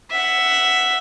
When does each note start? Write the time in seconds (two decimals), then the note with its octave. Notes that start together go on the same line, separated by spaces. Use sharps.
0.11 E5 F#5